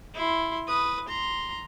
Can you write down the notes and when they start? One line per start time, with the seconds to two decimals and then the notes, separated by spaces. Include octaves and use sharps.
0.14 E4 C6
0.67 B4 D#6
1.08 A#5 C6